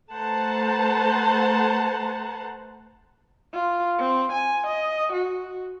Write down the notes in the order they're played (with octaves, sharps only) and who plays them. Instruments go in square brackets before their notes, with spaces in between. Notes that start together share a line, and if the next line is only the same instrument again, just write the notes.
[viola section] A3 B4 C5 F#5 A5 A#5
[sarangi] F4
C4
G#5
D#5
F#4